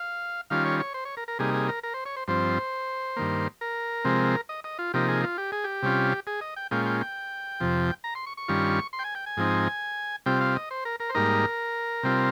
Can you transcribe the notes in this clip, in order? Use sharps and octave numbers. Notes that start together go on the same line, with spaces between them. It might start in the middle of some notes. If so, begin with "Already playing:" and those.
Already playing: F5
D#3 G3 C#4 F4 F5
C#5
C#5
C5
C#5
A#4
A#4
C3 G3 A#3 D#4 G#4
G#4
A#4
A#4
C5
C#5
C5
G2 F3 C4 C5
G2 D#3 A#3
A#4
C3 F3 G#3 C4
D#5
D#5
F4
C3 F3 A#3 D#4 G4
G#4
F4
G4
G#4
G4
C3 G3 C#4 F4
G#4
D#5
G5
A#2 G#3 C#4 F4 G5
G5
G5
F2 C3 F3
A#5
C6
C#6
C#6
G2 D#3 G3 C#4 F4
C6
G5
G#5
G5
G#5
G#2 F3 C4 D#4
C3 G3 C4 F4 G5
F5
D#5
C5
A#4
A#4
C5
G#2 G3 A#3 D#4 A#4
C3 G3 C4 F4